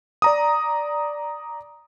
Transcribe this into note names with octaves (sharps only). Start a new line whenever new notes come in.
D5 A#5 D#6